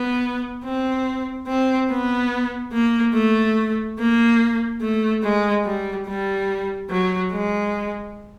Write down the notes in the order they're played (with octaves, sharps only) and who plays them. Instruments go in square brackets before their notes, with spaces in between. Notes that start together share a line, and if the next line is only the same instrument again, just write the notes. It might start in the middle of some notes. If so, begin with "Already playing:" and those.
Already playing: [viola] B3
C4
C4
B3
A#3
A3
A#3
A3
G#3
G3
G3
F#3
G#3